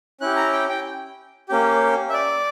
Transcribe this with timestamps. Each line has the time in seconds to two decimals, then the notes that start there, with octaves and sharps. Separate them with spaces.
0.21 C#4 E4 G4 F#6
0.36 A#5
0.53 G5
0.69 G5
1.49 A#3 C#4 G4
2.09 E5
2.13 D5